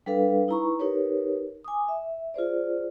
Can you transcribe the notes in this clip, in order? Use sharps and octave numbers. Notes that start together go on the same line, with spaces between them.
G3 D4 A4 B4 F5
D#4 E4 B4 A#5 B5 C#6
D#4 G4 A#4 B4 C#5
G#5 D6 D#6
E5
F4 G#4 C5 D5